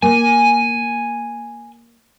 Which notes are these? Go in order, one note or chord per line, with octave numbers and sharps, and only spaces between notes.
A#3 G#5